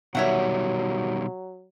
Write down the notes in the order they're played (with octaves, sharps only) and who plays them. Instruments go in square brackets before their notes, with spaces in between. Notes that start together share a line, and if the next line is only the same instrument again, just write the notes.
[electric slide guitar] B2 D#3 G3 [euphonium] F#3 [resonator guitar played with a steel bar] C#5 E5 F#5